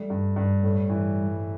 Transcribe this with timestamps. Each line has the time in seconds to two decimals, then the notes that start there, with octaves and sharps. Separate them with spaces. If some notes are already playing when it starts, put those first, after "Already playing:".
Already playing: G3 A3
0.10 G2
0.36 G2
0.63 A2
0.89 E3